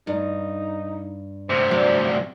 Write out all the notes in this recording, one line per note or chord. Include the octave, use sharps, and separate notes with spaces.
G2 D#4
D2 C3 C5
G2 F#3 D5